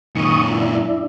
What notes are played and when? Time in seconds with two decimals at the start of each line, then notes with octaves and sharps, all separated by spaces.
0.15 F#2 A#2 D#3 C#6 D#6
0.51 D4 E4